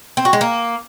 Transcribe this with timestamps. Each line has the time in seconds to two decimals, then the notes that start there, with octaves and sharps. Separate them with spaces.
0.17 C4
0.25 F#4
0.33 G#3
0.41 A#3